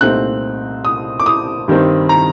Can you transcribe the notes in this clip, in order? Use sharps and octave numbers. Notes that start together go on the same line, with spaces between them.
C2 A#2 A3 C4 D#4 F#6
D#6
D6
D#6
G2 D#3 G3 C4
A#5